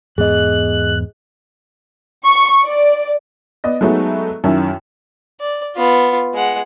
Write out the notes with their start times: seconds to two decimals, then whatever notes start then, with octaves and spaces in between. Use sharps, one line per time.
0.18 E2 G#2 B3 G#4 D#5 F#6
2.25 C#6
2.64 D5
3.64 B3 D5 D#5
3.81 F#3 G#3 A3 B3 D#4 F#4
4.44 F#2 D#3 C#4 E4
5.41 D5
5.76 B3 F4
6.34 G#3 F#5